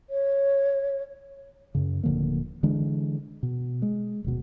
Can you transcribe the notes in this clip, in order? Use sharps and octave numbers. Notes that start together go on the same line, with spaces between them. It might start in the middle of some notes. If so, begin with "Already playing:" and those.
C#5
F#2 C#3
D1 D3 F3 A#3
D3 E3 G#3 D4
B2
G#3
D1 B2